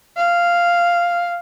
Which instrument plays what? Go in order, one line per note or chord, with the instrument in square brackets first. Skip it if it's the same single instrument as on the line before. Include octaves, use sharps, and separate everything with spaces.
[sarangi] F5